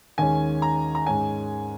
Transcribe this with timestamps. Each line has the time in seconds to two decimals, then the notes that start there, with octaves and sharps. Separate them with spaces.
0.18 D#2 D#3 G#3 C#4 G#5
0.62 A#5
0.95 A#5
1.07 G#2 G#3 C#4 G#5